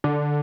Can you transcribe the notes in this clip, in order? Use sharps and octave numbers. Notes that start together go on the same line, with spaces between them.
D3